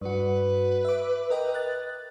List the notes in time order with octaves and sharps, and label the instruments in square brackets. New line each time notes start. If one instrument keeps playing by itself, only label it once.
[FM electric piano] G2 F#4 [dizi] B4
[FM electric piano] E5 D6
A#4 D#5 G5
F#6 A6